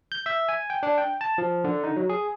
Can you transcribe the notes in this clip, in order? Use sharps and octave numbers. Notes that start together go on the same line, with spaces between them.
G6
E5
G#5
G5
D4
G5
A5
F3
D3
D#4
F#3
G#4